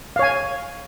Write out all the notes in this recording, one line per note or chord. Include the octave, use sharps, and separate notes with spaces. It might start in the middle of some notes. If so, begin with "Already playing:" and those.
C#5 F5 G#5